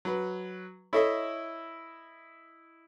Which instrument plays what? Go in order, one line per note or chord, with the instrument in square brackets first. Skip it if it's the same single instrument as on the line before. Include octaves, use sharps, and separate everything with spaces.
[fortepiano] F#3 B4
[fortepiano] E4 D#5 E5 [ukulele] A4 C#5